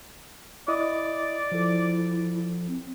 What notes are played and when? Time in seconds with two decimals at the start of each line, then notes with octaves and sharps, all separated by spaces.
0.68 E4 D5 D#5 D#6
1.52 F3 E4 A4
2.68 C4